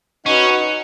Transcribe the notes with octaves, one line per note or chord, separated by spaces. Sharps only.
C#4 D#4 F#4 B4 D#5 F#5